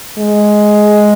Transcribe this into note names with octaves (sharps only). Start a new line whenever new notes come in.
G#3